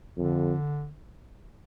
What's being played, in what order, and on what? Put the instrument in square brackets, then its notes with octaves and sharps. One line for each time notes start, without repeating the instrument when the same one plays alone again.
[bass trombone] F2 [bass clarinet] D3